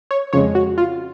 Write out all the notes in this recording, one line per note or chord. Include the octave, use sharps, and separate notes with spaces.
C#5
F2 C#3 G#3 C#5
F#4
F4